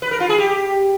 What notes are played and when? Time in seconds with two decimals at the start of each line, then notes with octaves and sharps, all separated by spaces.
0.02 B4
0.11 A#4
0.20 F4
0.29 G#4
0.38 G4